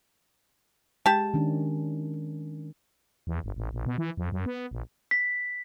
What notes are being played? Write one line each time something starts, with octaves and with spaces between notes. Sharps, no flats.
G#3 G4 A5
D#3 C#4 D4
E2
G1
A1
A#1
B2
E3
F2
F#2
B3
A#1
B6